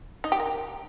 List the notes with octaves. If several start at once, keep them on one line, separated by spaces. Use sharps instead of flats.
D#4
G4
A#4